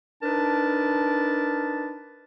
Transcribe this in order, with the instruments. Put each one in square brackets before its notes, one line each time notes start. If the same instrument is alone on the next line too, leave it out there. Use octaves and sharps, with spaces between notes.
[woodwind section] D4 D#4 A#4 B4 A5